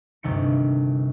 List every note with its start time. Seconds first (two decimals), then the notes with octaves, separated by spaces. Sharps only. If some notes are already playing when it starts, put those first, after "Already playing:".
0.23 G1 D2 C3 D#3 C#7